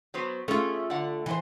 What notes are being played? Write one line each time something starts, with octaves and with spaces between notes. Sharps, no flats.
F#3 B3 C5
A3 C#4 F4 G#4
D3 D5 F#5
E3 C5